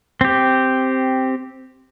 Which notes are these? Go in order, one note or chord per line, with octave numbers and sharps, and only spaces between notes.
C4 G4